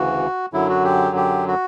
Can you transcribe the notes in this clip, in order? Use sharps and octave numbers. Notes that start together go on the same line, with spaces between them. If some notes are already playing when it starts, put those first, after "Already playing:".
Already playing: D2 C#3 E3 F#4
F#2 D3 F#3 E4
F#4
G4
G4
F#4